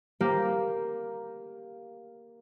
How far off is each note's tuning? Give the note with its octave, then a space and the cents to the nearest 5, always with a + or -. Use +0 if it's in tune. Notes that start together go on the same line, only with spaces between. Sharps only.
A#3 +0 G4 +0